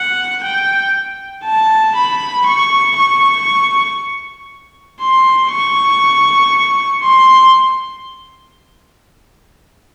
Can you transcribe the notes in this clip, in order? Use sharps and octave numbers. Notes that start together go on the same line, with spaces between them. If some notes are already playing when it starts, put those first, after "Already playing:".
Already playing: F#5
G5
A5
B5
C#6
C#6
C6
C#6
C6